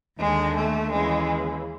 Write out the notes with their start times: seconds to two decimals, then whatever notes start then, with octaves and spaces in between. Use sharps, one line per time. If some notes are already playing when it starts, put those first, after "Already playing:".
0.19 D#2 D3 G#3
0.54 A3
0.90 D#2 C#3 E3 G#3